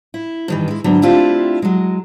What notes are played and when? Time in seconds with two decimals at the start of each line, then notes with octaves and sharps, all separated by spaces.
0.14 E4
0.48 G2 D#3 E3
0.68 G#3 E4
0.84 G#2 D3 F#3 B3
1.02 A3 C4 D4 E4 F4 G4
1.62 F#3 G#3